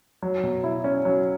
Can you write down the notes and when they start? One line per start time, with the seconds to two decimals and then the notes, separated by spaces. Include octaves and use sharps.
0.23 F#3
0.43 B2
0.64 E4
0.84 C#4
1.05 F#3